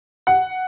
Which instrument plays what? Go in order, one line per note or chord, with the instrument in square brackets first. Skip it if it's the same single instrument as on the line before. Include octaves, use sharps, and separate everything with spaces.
[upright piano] F#5